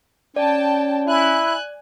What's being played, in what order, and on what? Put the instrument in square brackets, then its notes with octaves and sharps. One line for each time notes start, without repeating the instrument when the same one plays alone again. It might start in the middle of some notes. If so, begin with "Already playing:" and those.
[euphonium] C#4 [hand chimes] D5 [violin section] G5 A5
[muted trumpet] E4 [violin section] G#5 F#6